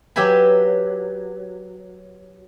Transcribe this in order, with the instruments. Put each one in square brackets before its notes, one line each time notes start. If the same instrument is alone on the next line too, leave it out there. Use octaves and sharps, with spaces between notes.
[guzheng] F#3 G4 B4 E5 G#5 B5